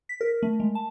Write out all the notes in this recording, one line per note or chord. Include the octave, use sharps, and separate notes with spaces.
B6
A#4
A3
G#3
A5